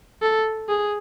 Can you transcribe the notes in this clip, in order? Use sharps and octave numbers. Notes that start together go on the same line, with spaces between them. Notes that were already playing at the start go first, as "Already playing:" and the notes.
A4
G#4